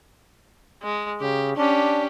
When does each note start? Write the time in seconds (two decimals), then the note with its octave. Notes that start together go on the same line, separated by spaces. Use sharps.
0.82 G#3
1.21 C#3 G4
1.57 C#4 D4 G4